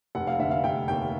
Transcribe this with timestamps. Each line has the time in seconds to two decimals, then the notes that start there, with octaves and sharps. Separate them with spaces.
0.15 F1 F#5
0.27 F5
0.39 D3 E5
0.51 F5
0.64 F1 G5
0.88 D#2 G5